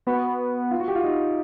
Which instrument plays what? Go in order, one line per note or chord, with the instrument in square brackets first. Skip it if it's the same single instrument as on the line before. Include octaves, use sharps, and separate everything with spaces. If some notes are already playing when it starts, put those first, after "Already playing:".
[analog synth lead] B3 [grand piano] F#4
[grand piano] F4
F#4
G4
F4
D#4